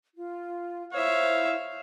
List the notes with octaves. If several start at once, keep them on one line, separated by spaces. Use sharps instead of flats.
F4
E4 C5 C#5 E5 F5